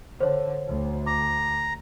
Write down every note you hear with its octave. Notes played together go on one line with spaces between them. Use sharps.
D3 C5 C#5
D2
A#5 D6